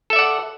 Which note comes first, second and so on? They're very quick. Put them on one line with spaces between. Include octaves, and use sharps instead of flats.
A4 E5 D5 F#5